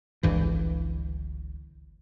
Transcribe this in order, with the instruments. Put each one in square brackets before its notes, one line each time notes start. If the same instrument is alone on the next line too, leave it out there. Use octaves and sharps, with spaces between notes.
[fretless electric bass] G1 C#2 G2 E3